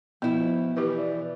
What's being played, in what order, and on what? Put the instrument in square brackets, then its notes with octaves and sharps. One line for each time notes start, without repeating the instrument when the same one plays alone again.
[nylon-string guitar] B2 E4 [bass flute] F3 [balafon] B3
[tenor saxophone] E3 [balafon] G4 B4
[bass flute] D5